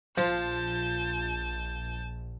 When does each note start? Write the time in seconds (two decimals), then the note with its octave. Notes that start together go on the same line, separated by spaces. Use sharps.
0.17 A#1 F3 F4 A5 G6